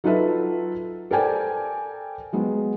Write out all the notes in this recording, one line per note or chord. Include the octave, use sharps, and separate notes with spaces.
F#3 D#4 F4 A4 B4 E5
A4 A#4 C5 D5 G5 G#5
F#3 G#3 B3